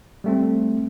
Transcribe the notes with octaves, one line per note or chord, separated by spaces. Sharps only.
G3 A3 C4